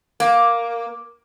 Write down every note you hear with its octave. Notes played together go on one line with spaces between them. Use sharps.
A#3